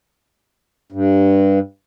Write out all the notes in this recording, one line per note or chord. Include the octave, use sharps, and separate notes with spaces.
G2